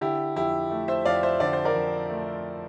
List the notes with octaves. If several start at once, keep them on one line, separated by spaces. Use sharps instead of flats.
D3 E4 G4
F2 E4 G4
A3
C5 E5
F2 D5 F5
C5 E5
D3 D5
C5
A#4 D5
F2
A3